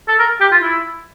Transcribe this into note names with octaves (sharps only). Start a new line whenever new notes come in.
A4
A#4
G4
F4
E4